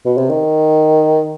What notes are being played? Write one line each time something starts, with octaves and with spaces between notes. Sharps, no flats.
B2
C3
D#3